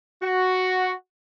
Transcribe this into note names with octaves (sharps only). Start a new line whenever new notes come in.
F#4